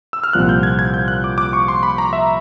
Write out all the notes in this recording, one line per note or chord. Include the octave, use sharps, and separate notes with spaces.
E6
F6
C2 A#2 F3 F#6
G6
G#6
G#6
G6
F#6
D6
D6
C#6
C6
B5
A#5
E5